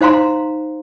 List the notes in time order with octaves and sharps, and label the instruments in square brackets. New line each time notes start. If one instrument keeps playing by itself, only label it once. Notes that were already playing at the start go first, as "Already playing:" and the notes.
[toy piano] D#4 C5 F5 A#5 C6